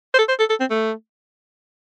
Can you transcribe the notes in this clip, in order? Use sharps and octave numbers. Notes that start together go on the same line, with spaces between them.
C5
A4
C5
A4
A4
C4
A3